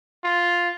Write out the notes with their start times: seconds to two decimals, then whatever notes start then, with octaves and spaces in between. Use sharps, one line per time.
0.24 F4